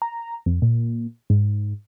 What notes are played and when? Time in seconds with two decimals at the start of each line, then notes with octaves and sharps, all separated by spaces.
0.02 A#5
0.46 F2
0.62 A#2
1.30 G#2